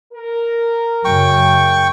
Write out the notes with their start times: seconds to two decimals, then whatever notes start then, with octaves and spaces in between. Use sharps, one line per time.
0.13 A#4
1.05 F#2 C#3 G5 C#6